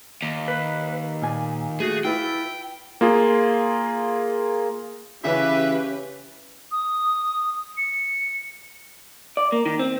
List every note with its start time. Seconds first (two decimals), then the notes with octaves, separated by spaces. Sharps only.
0.22 D#2
0.48 B4
1.22 A#2 G#5
1.80 A3 F#4 G#4
2.05 E4 F4 B4 G5
3.01 A#3 F4 G#4
5.24 C#3 E3 C#4 G4 B4 E5
6.72 D#6
7.77 C#7
9.37 D5
9.52 A#3
9.66 D#3
9.79 C4